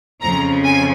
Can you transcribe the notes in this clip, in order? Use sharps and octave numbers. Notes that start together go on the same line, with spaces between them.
F2 C#3 F3 A#5
G#5